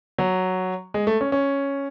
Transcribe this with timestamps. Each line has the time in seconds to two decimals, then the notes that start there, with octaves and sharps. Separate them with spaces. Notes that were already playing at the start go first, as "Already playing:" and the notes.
0.18 F#3
0.94 G#3
1.07 A3
1.21 C#4
1.32 C#4